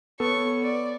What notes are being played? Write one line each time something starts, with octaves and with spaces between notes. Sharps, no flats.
B3 A4 C#5 C#6
D5